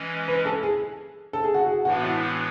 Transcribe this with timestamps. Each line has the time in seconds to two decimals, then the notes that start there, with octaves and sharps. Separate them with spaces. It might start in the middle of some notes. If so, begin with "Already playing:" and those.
Already playing: E3 G#3 C#4
0.28 B4
0.45 A4
0.63 G#4
1.33 A4
1.44 G#4
1.54 F#4
1.66 G#4
1.85 A2 E3 G#3 B3 D4 F#4
2.03 E4